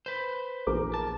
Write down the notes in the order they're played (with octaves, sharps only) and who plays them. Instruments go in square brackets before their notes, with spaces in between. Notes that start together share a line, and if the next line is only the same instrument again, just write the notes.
[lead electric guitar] B4 C5
[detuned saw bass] A#1 [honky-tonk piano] E2 A#4 D6
[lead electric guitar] A5